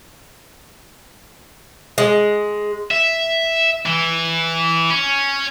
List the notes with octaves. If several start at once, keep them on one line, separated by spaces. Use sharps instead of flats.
G#3
E5
E3
C#4